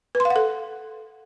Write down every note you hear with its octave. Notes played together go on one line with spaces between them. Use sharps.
B4
C6
F5
F#5
A4